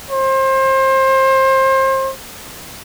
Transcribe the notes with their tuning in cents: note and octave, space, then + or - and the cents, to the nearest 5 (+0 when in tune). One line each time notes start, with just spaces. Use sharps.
C5 +30